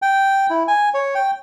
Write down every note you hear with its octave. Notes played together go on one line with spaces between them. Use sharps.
G5
E4
G#5
C#5
G5